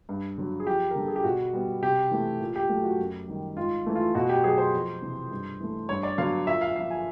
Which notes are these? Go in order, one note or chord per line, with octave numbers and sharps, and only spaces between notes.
G2
D3 F#3
G#4
F2 G4
A#4
D3 G3 A#3 A4
G#4
G4
B2 F#4
G3 B3
C3 G4
E3 A3
A#2
G4
F#3 A3
F#4
F#2
D#3 G3
G#2 F4
E3 A3
F4
B2 F#4
G4
F#3 B3 G#4
C5
F2
C3 E3
G2
E3 A3
G2 C#5
D5
D3 F#3 B3 F5
A#2 E5
F5
F3 A#3 F5
G#5